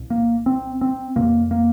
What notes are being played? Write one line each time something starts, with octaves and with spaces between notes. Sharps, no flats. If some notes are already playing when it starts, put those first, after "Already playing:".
Already playing: C2 A#2
A#3
C4
C4
F1 F2 C3 A#3
A#3